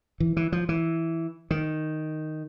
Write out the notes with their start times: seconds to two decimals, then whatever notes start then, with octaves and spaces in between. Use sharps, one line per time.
0.20 E3
0.37 E3
0.52 F3
0.69 E3
1.51 D#3